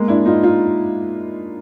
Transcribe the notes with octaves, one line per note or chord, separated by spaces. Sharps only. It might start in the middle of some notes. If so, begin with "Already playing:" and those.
Already playing: G#3 A#3
D4 E4
D#4 F4
D#4 F4